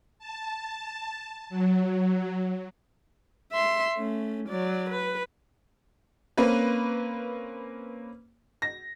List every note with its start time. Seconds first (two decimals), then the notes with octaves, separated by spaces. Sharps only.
0.19 A5
1.50 F#3
3.52 E5 C6
3.97 A3 C#4
4.48 F#3 D5
4.90 B4
6.37 A#3 C4 C#4 B4
8.62 A#6